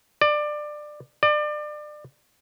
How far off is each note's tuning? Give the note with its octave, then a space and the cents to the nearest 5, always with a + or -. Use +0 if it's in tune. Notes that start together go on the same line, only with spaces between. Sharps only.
D5 +20
D5 +30